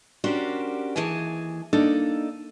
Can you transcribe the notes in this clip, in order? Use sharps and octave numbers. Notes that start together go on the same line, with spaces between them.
C#4 D4 F#4 G4 A#4 C5
D#2 E3 G#4 G#5 A5
A#3 D4 D#4 A4